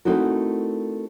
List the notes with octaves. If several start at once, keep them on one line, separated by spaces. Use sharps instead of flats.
A3 C4 D#4 E4 F#4 A#4